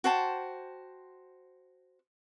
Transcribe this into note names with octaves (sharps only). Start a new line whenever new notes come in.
F#4 C5 G5 A5